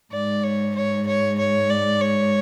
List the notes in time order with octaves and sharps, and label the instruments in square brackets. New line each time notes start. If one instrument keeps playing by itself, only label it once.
[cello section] G#2 [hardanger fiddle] D5
[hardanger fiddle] C#5
C#5
C#5
C#5
D5
C#5